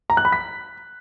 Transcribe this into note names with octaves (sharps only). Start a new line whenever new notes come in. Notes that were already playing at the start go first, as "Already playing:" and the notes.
A#5
F#6
B5
B6